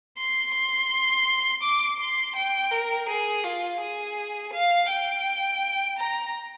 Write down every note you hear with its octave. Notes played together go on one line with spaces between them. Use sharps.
C6
C6
D6
C6
G5
A#4
G#4
F4
G#4
F5
G5
A#5